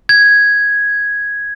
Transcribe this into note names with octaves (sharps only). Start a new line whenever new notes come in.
G#6